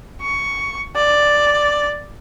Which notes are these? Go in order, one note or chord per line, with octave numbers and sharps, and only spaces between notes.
C#6
D5